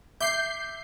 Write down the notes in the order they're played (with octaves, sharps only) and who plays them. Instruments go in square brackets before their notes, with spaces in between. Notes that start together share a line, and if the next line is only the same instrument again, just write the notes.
[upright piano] E5 D6 [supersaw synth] G6 C7